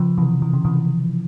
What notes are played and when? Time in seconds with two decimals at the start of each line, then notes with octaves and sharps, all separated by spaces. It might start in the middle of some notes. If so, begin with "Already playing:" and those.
Already playing: C#3 F3
0.18 C3 E3
0.42 E3
0.53 C#3
0.65 C3 E3